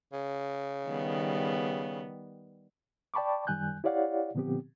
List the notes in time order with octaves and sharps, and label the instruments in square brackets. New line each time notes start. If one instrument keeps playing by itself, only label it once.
[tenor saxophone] C#3
[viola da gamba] D#3 G3 B3
[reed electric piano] D5 G5 A5 B5 C#6 D6
F#2 D#3 G3 G#5 F#6 G6
E4 G4 C#5 D5 F5 F#5
A#2 D3 F3 B3 C4 G4